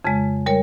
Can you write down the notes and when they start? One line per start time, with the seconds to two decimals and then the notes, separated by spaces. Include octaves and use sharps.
0.04 F2 C#3 G#3
0.46 G3 A#4 C#5